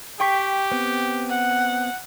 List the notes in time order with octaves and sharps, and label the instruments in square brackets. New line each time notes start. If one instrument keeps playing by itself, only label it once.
[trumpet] G4 [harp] G5 C#6 B6
[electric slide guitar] B3 C4
[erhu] F#5